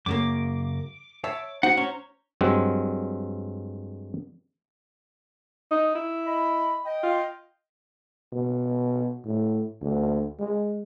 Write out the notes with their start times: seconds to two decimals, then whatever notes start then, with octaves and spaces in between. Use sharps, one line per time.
0.06 F#2 C#3 A#3 D6
1.24 C#5 E5 A5
1.63 D#4 F#4 C5 F#5
1.77 C#4 C5 C#5 A#5
2.41 G2 F#3 G#3 C4
5.71 D#4
5.95 E4
6.25 D#5 B5
6.85 D#5 G5
7.03 F4
8.33 B2
9.25 A2
9.81 D2
10.40 G#3